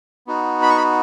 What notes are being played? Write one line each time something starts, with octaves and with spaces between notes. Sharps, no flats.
B3 D#4 F#4
B5
C#6
B5